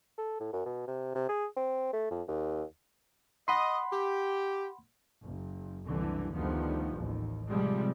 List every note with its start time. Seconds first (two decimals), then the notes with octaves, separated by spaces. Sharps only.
0.18 A4
0.40 A2
0.53 F#2
0.66 B2
0.87 C3
1.15 C3
1.29 G#4
1.57 C4
1.93 A3
2.11 F2
2.28 D#2
3.48 D#5 F#5 B5 C6
3.92 G4
5.22 F#1
5.87 F#1 C2 D3 E3
6.33 D2 D#3 F3 G3 B3
6.96 A1 D#2
7.48 C3 F3 G3 G#3